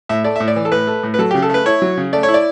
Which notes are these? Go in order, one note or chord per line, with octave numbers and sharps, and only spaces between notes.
A2 E5
A3 D5
A2 E5
D5
E3
A4
A2 B4
A3
A2
B4
F#3 A4
G4
C#3
A4
A3 B4
E4 C#5
F#3
C#3
A3 D5
C#5
E4
D5